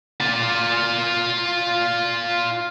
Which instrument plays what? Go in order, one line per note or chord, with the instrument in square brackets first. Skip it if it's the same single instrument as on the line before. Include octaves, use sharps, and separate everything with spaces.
[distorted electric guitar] F4 D5